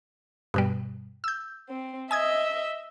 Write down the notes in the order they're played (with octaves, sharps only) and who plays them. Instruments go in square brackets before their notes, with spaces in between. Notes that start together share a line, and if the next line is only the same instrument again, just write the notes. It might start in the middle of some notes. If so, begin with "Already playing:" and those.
[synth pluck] G2 B2 G3
E6 G6
[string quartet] C4
[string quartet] D#5 E5 [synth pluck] G#5 D#6 G#6